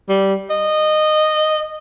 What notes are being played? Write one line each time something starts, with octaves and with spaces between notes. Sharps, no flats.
G3
D#5